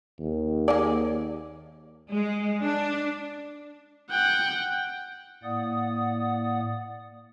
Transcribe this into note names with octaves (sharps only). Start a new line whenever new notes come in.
D#2
A#3 G#4 D5
G#3
D4
F#5 G5
A2 A#3 D5 F#5 D#6